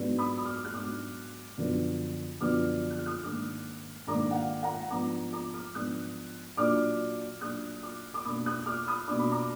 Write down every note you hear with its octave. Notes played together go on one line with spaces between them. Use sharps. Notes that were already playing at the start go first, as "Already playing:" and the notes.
Already playing: G#2 F#3 B3 D4
B5 D#6
D#6
D6 F6
F#6
G#2 F#3 B3 D4 D6 F6
F#2 D3 F3 B3 D4
F#2 D3 F3 B3 D4 D6 F6
F#6
F6
D#6 F#6
G#2 D#3 A#3 D4 D6 F6
G#2 D#3 A#3 D4 A#5 D6
F#5
F5
F#5 A#5
G#2 F3 B3 D4 A#5 D6
A#5 D6
D6 F6
G#2 F3 B3 D4 D#6 F#6
A#2 F#3 D4 D6 F6
A#2 F#3 D4 D#6 F#6
D6 F6
D6
B2 A#3 D4 B5 D#6
D#6 F#6
D6 F6
B5 D#6
B2 A#3 D4 D6
B5
A#5 D6